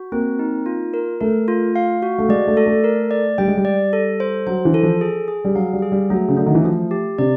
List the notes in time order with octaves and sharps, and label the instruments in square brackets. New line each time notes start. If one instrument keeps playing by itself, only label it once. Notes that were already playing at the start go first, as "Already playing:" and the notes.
Already playing: [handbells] F#4
[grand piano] A#3 [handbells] C4
[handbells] D#4
F4
A#4
[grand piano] A3 [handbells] A#4
[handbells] F4
F5
F#4
[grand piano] A3
[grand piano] G#3 [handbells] D5
[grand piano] A3
[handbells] A4
[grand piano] A3
[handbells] A#4
D5
[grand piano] G3 [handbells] G5
[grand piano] G#3
G3
[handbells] D5
A4
C5
[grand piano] F#3 [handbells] C5
[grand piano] E3
[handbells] A4
[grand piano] F3
[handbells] G#4
G#4
[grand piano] G3
[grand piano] F#3 [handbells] F5
[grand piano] G3
[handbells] G#4
[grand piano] G3
[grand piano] F#3 [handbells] A3
[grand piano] C#3
[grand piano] D3 [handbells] A3
[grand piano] D#3
E3
[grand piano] F3 [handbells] A3
[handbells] G4
[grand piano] C3 [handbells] D5